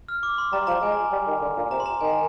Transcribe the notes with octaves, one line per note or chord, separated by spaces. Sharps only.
F6
D6
C6
G3 A#5
F3 A#5
G#3 G#5
G3
D#3
D3
A#2
C3 A#5
C6
A#5
D#3 G#5